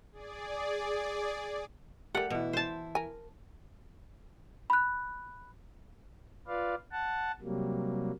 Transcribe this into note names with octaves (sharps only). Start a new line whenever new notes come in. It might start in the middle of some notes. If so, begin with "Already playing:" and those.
G#4 D5
G3 A3 G4 A#4 F#5
B2 E3 E4
C5 A5
A#4 G#5
B5 F#6
F4 B4 D5 F5
F#5 A5
C3 F#3 G3 A#3